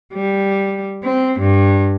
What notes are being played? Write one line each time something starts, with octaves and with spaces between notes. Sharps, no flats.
G3
C4
G2